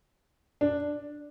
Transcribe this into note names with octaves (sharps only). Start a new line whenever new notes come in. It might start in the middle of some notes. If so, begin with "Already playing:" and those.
D4